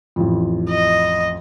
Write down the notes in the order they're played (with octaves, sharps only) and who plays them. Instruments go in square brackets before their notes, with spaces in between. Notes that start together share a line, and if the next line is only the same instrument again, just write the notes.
[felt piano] A1 F2
[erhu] D#5